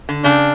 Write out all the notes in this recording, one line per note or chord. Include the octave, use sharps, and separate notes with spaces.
D3
C#3 D4